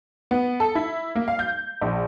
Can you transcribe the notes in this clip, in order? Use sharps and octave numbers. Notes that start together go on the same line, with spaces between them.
B3
A4
E4
A#3
F5
G6
A#1